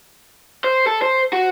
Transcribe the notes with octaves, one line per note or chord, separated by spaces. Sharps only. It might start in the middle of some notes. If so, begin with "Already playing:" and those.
C5
A4
C5
F#4